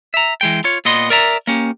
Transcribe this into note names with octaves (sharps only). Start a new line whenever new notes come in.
E5 A#5
E3 G#3 G5
F4 C#5
A#2 B3 D#5 C6
A#4 D5 E5 A#5
A#3 C#4 G4